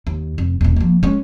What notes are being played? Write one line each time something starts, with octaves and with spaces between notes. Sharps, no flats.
D#2
F1
D#1 B2
F3 A#3
G#3 C#4